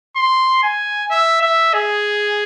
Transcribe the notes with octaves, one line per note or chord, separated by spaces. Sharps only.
C6
G#5
E5
E5
G#4